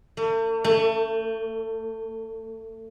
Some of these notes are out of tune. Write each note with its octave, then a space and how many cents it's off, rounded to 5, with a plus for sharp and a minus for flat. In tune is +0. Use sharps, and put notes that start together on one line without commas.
A3 +45
A3 +25